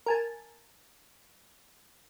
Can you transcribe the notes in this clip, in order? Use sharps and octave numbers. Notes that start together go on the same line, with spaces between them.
A#4 G#5 A5